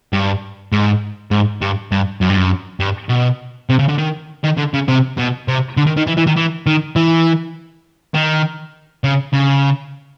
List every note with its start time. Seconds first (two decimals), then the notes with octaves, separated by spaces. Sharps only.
0.13 G2
0.72 G#2
1.31 G#2
1.62 G2
1.92 G2
2.21 F#2
2.29 G2
2.37 F#2
2.80 G2
3.09 B2
3.70 C3
3.79 C#3
3.89 D3
3.98 D#3
4.44 D#3
4.58 D3
4.74 C#3
4.88 C3
5.18 B2
5.48 C3
5.77 D3
5.87 D#3
5.97 D#3
6.07 E3
6.17 E3
6.27 D#3
6.36 E3
6.66 D#3
6.96 E3
8.14 D#3
9.04 C#3
9.33 C#3